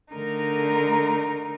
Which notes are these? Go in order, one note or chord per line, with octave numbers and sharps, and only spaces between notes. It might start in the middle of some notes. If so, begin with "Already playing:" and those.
D3 A3 D#4 A#4